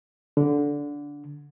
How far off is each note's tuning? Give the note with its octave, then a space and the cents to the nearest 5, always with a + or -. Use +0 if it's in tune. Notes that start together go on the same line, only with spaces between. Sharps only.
D3 -15